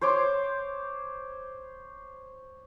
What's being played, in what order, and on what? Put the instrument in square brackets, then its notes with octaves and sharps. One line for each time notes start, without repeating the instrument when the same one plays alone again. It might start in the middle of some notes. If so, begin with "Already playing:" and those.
[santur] C5 C#5 C6 D6